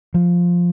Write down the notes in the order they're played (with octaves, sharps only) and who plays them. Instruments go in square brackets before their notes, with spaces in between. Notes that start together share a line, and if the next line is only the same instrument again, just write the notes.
[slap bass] F3